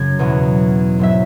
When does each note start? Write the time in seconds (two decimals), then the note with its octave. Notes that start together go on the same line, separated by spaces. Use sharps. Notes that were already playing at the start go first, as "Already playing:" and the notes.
Already playing: F#2 C#3 G#6
0.19 E2 B2 F#3
0.99 G#2 F#3 E5